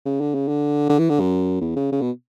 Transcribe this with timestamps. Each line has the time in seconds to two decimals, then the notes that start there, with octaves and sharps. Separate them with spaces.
0.05 C#3
0.21 D3
0.35 C#3
0.48 D3
0.89 D3
0.99 E3
1.10 D3
1.20 F#2
1.61 E2
1.76 C#3
1.92 C#3
2.02 B2